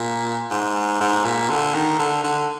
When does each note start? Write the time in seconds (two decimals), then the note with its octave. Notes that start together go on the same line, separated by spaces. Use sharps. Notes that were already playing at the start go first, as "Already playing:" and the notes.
Already playing: A#2
0.51 G#2
1.00 G#2
1.25 A#2
1.49 D3
1.74 D#3
1.99 D3
2.24 D3